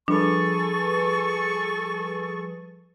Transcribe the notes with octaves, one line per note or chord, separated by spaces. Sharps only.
F3 G3 D4 G#4 A4 B4 C#6